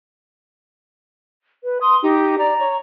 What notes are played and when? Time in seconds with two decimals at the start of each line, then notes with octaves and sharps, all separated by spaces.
1.64 B4
1.81 C6 D#6
2.03 D#4 G4
2.38 D5 A#5
2.60 C#5